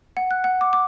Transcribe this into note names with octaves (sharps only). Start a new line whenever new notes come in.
F#5
F#6
F#5
D6
D6